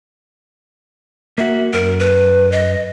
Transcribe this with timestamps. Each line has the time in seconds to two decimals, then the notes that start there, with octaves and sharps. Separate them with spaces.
1.38 A#3 F#4 E5
1.73 F#2 A#4
1.99 B4
2.52 D#5